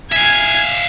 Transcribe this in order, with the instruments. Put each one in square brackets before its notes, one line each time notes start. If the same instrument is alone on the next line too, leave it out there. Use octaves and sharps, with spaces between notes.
[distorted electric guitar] E5 F5 [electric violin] G#5 G#6